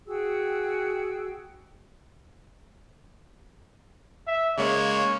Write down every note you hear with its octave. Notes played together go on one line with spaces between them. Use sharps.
F#4 G#4 G5 E6
E5
C#3 G#3 A#3 C#5